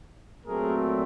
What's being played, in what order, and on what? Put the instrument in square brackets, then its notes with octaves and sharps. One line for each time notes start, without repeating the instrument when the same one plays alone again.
[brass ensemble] A#2 F#3 A3 C4 G#4 A#4